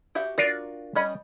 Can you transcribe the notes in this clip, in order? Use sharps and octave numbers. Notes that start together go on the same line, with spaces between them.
F#4 G4 E5
D4 F4 F#4 A#4 D5
G3 C#4 D#5 G#5 B5